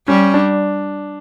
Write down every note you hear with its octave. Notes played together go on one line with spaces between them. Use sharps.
G3 C#4
D4